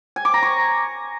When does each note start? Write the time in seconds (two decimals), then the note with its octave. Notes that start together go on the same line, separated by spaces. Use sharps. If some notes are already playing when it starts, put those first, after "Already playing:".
0.16 G#5
0.25 D6
0.34 A#5
0.43 C#6